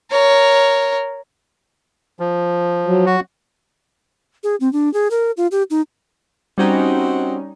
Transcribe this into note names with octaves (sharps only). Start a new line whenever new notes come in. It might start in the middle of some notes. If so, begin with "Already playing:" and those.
A#4 C#5
F3
F#3
F#4
G#4
C4
D4
G#4
A#4
F4
G4
D#4
G3 C4 C#4 D#4 F#4